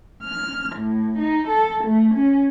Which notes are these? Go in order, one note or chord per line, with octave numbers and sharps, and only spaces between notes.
F6
A2
D#4
A4
A3
C#4